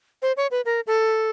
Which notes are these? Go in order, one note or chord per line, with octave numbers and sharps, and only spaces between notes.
C5
C#5
B4
A#4
A4